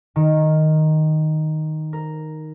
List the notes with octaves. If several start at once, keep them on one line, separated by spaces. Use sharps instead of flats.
D#3
A#4